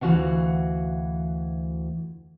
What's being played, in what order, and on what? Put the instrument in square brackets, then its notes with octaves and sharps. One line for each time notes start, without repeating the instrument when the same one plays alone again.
[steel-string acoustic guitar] D2 E3 D4 F#4 F5 F#5